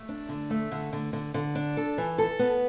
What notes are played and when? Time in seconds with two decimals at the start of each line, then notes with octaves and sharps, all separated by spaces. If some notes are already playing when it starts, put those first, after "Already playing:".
Already playing: A3
0.09 D4
0.29 D3
0.50 A3
0.72 D3
0.93 D3
1.13 D3
1.34 D3
1.55 D4
1.77 A4
1.98 E3
2.18 A4
2.39 B3